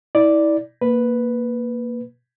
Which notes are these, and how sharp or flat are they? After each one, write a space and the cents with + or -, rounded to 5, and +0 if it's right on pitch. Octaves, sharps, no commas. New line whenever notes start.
E4 -30 D5 +0
A#3 +0 B4 +0